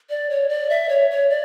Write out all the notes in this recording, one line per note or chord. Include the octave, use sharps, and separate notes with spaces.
D5
C#5
D5
E5
C#5
C#5
D5